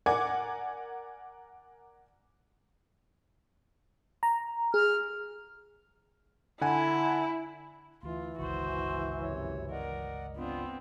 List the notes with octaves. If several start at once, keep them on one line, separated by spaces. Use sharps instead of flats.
A#4 D5 F#5 G#5 D6 G#6
A#5
G#4 F6
D3 E4 F#5 G#5
D2 E3 F4
G1 C#2 D#3 F#4 C5
F#2 C3 C#5
A#4 D5 D#5 F#5
B3 C4 D4 F4